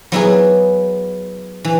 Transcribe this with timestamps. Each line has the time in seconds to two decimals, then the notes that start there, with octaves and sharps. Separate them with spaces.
0.12 F#3 B3 E4 G#4
1.65 E3